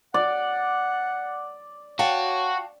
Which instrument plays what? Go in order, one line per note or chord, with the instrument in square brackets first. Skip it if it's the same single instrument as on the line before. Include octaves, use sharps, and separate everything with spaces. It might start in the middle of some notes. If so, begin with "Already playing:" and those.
[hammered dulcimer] D5 [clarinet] F#5
[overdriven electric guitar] F#4 [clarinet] C#5 [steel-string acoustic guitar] F5 G5 A5